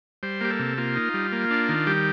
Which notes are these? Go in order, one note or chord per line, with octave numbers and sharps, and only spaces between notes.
G3 C5
A#3 G4
A4
C3
A#3 F4
D#4
G3
A#3
D4
D#3
G3 G4